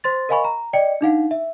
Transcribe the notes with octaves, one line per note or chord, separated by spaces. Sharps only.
C5 C6 A6
A#4 D#5 F5 G#5 B5 C#6
A#5
D5 D#5 G5 C#7
D4 D#4 F5 F#5
E5